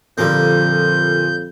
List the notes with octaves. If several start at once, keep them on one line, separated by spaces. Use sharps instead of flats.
F2 A#2 D3 F3 G3 A#3 G6